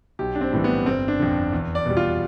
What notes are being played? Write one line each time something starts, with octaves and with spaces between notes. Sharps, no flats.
B1 G4
D4
C4
A2 E3 G3
B3
G1 C4
D4
F2 D3
E2
D5
B2 G3
F4